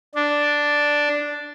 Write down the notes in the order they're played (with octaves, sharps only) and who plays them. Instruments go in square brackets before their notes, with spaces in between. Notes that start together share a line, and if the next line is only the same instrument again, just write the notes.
[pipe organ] D4